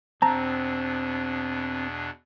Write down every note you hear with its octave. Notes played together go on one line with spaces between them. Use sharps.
E2 B2 C4 D4 A5 A#5